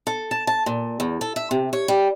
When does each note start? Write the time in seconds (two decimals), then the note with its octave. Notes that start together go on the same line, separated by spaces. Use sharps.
0.07 A4
0.31 A5
0.47 A5
0.66 A#2
1.00 E2
1.21 A4
1.36 E5
1.51 C3
1.73 C#5
1.88 G3